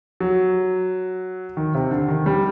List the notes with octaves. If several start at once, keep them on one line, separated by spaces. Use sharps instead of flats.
F#3
D#3
C3
D3
D#3
G3